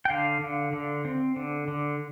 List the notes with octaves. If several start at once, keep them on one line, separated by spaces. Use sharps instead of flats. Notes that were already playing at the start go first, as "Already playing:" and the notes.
G5
D3 F5
D3
D3
C4
D3
D3